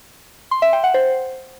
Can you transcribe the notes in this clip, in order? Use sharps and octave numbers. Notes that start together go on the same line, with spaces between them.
C6
E5
G5
F#5
C5